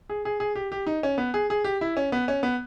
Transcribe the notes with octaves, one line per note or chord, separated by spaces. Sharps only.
G#4
G#4
G#4
G4
G4
D#4
C#4
B3
G#4
G#4
G4
E4
C#4
B3
C#4
B3